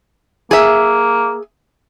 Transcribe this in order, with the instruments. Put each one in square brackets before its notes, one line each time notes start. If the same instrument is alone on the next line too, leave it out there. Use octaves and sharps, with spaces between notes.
[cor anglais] A#3 [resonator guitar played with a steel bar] G#4 E5